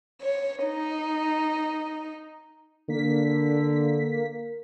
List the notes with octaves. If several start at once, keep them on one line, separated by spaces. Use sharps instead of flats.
C#5
D#4
D3 A#3 B6